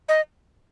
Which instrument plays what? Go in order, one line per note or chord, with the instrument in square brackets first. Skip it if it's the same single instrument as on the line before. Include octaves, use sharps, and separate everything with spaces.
[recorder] D#5